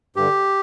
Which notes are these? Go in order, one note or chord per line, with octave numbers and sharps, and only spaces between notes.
G2 D3 G4